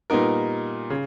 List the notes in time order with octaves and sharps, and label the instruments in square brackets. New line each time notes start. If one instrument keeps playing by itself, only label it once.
[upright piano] A#2 G3 B3 D#4 A#4
C#3